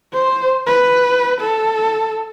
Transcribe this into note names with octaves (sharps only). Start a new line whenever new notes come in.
C5
B4
A4